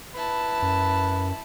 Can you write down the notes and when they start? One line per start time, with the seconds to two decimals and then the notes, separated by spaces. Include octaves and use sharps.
0.16 E4 B4 A5
0.62 F#2